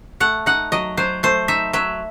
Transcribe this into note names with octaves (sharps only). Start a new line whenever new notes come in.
A3 F#5
D#4 F#5
F#3 D#5
F#3 C5
A3 C5
D#4 E5
F#3 E5